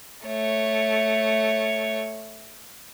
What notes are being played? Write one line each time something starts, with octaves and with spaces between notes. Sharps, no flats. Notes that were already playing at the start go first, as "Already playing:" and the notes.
A3 C#5